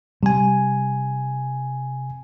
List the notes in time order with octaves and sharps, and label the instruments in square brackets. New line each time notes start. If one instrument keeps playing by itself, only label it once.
[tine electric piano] C3 G#5 [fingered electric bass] G3